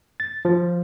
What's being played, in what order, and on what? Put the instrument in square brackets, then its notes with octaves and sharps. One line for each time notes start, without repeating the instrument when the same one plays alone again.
[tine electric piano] A6
F3